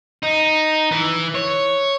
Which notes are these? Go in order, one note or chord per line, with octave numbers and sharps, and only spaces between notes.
D#4
E3
C#5